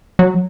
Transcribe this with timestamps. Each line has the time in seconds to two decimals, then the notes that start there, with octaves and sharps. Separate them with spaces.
0.19 F#3